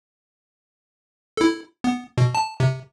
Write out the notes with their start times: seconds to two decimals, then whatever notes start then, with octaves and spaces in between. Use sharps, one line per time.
1.37 E4 A4
1.84 B3
2.18 B2
2.35 A5
2.60 C3